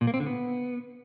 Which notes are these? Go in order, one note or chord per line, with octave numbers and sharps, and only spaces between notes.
A#2
A#3
C4
D3
B3